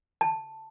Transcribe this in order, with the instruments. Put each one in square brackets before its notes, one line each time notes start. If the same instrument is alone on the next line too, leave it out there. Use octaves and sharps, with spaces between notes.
[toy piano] A5